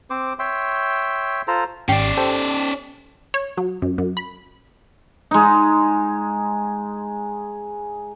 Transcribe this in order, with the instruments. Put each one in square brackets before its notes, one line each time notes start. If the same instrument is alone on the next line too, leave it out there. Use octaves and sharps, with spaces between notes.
[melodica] C4 C5 D6
C#5 E5 G5 C6
F4 A4 C5 A#5
[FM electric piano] G#1 G4 C7 [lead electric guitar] C#4 D5
[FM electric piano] G4 A4 C5
[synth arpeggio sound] C#5
F#3
F#2
F#2
B5
[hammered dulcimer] G#3 D#4